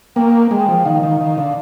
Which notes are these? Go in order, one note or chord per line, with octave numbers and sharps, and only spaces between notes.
A#3 G5
G#3
F3
D#3 F5
D#3
D#3
D3